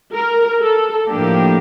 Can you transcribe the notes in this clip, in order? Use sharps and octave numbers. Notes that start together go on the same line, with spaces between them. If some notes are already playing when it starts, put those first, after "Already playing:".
A#4
A4
A2 F3 A#3 D4 G4